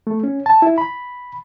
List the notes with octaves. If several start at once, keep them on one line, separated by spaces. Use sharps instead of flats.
A3
C#4
A5
E4
B5